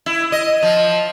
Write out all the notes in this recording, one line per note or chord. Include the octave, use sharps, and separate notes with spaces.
E4
D#5
F3